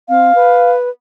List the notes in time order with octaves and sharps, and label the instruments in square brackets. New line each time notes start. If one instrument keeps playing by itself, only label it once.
[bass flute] C4 [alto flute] F5
[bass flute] B4